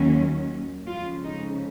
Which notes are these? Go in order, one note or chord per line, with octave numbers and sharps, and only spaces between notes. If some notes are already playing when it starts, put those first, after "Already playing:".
Already playing: D#2 D#3 F#3 C#4
F2 C#3 G#3 C#4 F4
D#4